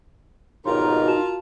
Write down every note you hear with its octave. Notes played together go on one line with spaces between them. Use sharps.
G#1 B2 D#4 F4 G4 A#4 C#5 C6
F#4 A5 E7